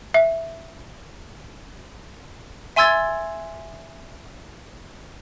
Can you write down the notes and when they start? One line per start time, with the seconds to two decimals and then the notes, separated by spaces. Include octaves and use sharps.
0.14 E5
2.76 E5 G#5 C6 E6 G#6 A6